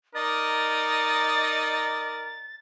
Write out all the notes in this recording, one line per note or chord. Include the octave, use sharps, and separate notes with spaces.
D#4 A#4 D5 D#5 A6